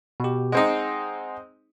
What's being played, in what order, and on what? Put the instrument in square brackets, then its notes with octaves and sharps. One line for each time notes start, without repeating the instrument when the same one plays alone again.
[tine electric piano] B2 G4
[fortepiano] G#3 C4 D#4 [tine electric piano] F#5 G#5